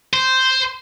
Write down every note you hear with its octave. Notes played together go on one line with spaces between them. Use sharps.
C5